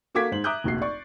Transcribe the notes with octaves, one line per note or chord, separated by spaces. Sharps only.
A3 A#3 F#4 D6 G#6 B6
G#2 C5 F#7
E5 A#5 D6 D#6 F#6 G6
F1 A#1 F#4 C7
D5 C#6